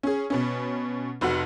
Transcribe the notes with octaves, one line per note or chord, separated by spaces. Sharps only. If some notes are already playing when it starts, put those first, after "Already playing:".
C#4 G#4
B2 B3 C#4
F1 F2 F#4 F#5